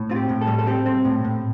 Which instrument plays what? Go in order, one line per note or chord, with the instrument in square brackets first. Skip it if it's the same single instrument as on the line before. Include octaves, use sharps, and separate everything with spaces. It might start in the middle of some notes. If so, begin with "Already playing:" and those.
Already playing: [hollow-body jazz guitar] A2
C4 F4
G4
A2
A4
G3
A4
C4 G4
C4
A2
A2